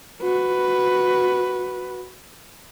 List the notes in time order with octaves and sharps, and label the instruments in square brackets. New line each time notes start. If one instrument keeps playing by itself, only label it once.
[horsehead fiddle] F#4 B4